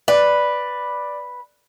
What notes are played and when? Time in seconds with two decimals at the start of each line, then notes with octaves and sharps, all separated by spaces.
0.08 B4 D5